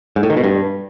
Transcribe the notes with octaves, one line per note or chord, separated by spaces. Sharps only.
G#2
A2
D#3
B2
G2